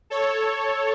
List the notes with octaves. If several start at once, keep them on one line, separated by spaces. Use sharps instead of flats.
A4 C#5